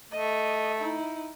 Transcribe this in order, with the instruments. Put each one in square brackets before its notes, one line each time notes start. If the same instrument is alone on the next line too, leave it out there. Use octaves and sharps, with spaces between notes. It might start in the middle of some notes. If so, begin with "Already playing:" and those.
[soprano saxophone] A3 [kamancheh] D#5
[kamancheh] D#4 E4